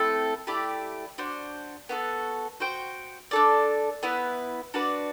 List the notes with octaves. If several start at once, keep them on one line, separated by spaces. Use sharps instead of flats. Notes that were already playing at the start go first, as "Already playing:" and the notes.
Already playing: A3 C4 E4 A4
A3 E4 G4 D5
D4 F#4 C5
B3 F#4 A4
F#4 C5 G5
D4 A4 D5
B3 E4 B4
D4 F#4 B4 D5